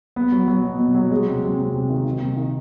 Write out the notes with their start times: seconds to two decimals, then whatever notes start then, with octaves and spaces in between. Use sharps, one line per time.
0.16 B3
0.32 F#3
0.48 F#3
0.64 B2
0.79 B2
0.95 F#3
1.11 G#3
1.27 C3
1.42 C3
1.59 C3
1.74 C3
1.90 D#3
2.05 D#3
2.22 C3
2.37 D#3